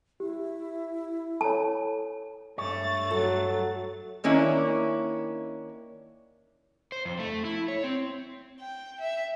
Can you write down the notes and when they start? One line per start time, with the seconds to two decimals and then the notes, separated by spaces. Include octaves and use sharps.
0.20 E4 G4
1.41 A4 C#5 A5
2.58 G2 A3 C#5 A6
3.11 F#3 A4
4.24 D#3 A#3 C#4 D4 E4
6.92 C5
7.05 F2
7.19 A3
7.45 E4
7.68 C#5
7.84 C4
8.60 G5
9.00 E5